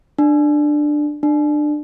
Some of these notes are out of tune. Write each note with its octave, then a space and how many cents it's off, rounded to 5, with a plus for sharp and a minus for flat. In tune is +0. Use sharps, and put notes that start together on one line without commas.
D4 +15
D4 +25